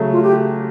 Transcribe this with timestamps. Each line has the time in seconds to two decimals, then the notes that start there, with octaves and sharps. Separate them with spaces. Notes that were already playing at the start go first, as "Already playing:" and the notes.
Already playing: C#3 F#3 A3
0.11 F4
0.22 G4